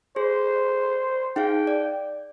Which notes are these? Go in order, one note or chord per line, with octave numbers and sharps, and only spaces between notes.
G#4 C5
D#4 G#4 F5 G5
D5